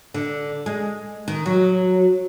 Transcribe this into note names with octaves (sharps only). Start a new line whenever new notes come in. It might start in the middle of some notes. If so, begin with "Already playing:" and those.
D3
G#3
D#3
F#3